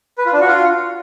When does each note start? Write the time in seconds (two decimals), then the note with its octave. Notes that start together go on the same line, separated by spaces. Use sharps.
0.18 B4
0.26 F4
0.33 D4
0.40 F#4
0.48 F4